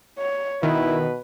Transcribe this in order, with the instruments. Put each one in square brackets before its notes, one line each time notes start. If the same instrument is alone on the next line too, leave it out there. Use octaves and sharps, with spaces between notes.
[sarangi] C#5
[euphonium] B2 [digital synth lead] D#3 [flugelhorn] E4 [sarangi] B4